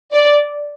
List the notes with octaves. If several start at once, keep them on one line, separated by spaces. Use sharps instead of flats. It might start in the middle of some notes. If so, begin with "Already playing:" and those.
D5